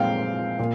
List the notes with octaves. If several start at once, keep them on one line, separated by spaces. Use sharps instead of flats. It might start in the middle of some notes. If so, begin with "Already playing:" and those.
Already playing: A#2 G#3 C4 F5 G5
A#2